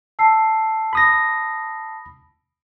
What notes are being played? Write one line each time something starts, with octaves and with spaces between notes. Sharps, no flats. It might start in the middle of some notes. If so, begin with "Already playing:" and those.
A5 E6 C7
B5 D#6 A#6